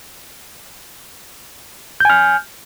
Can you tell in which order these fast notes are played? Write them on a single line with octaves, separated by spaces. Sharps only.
G6 G#5 F6